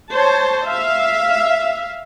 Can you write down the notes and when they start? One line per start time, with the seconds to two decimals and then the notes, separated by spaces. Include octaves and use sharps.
0.12 C5 C#5 A5
0.65 E5 F5